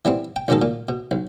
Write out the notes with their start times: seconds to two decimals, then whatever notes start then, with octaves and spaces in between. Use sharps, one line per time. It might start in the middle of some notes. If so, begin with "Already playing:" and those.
0.05 E3 G3 B3 C4
0.36 G5
0.48 B1 F#2 B2 D#3 G#3 A4
0.62 A#2
0.89 B2
1.11 B1